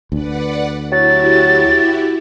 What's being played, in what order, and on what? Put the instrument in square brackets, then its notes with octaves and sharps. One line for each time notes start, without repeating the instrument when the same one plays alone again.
[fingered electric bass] D2 [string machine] B4 D5 F#5
[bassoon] F#3 [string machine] E4 F#4 G4 [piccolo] A6